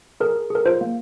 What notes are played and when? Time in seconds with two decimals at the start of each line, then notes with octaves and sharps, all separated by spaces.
0.20 G#4 A#4
0.36 G#4
0.50 G#4 A#4
0.65 F4 C5
0.81 A#3